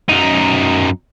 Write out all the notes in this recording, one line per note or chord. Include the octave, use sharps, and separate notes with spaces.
F#2 D#4